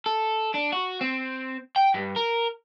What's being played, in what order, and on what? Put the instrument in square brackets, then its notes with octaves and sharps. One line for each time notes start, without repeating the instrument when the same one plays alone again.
[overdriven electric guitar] A4
D4
F#4
C4
G5
G2
A#4